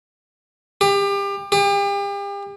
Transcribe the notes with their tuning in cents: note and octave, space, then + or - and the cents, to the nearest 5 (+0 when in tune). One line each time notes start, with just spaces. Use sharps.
G4 +30
G4 +40